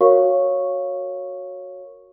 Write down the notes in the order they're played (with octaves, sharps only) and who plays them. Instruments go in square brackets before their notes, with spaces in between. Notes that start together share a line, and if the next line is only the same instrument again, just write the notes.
[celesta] F#4 A#4 C#5 F5 C#6